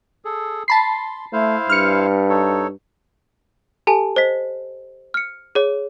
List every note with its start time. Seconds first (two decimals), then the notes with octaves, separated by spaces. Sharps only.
0.25 G#4 A4
0.68 A5 B5 C6 C7
1.33 A3 E4 C5 F5
1.69 G2 F6 C#7
2.29 D#4 A4 C#5
3.87 G4 A4 G#5 A5
4.16 C5 D#5 B6
5.14 F6 C#7
5.55 G#4 C#5